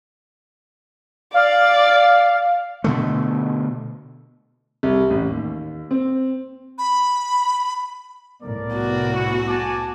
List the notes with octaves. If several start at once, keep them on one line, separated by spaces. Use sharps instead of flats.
D5 F5
B2 D3 A3
C2
A1
D#2
C4
B5
C2 A2 B3 A#4 D5
F#4
C#4 E4 C#6
G#5 A5 D6